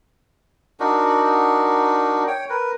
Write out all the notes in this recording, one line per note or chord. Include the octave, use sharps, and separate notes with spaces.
D4 D#4 F#4 A#4
C#5 G5
A#4 B4